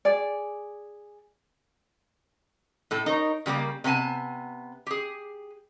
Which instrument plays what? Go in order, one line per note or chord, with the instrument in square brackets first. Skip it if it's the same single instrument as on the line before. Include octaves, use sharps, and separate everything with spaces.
[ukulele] G#4 D5
[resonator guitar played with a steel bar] A2 A4
D#4 A#4 C#5
C#3 G3 A3 A#3
C3 B3 F4 G#5 A5
G4 G#4